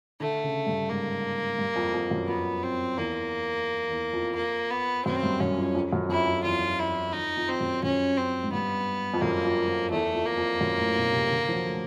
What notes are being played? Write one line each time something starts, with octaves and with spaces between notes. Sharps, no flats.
D3 A3
C#3
G2
G#2 A#3
G2
F2
F2
F#2
F2 B3
C4
E2 A#3
E2
F2
A#3
B3
F#2 C4
G2
F#2 C#4
F2
F2
F#2
F2 E4
F2
E2 F4
E4
F2 D#4
F2
F2 C4
F#2
F#2 C#4
C4
G#2
G2 B3
F2
F#2 A#3
F2
F2
E2 A3
F2
A#3
F2
F#2
A2
B2
C3
D3
F3
F#3
A3